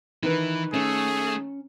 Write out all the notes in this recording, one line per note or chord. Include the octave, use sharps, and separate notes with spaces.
D#3 E3 B4
A3 C#4 G#4